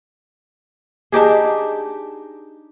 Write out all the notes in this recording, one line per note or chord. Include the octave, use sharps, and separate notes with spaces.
D4 D#4 G4 G#4